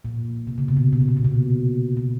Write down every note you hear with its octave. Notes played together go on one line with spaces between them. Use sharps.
A#2
C3
C#3
B2
C3
B2
A#2
B2
A#2
B2
B2